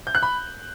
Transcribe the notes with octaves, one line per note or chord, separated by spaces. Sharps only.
G6
F#6
B5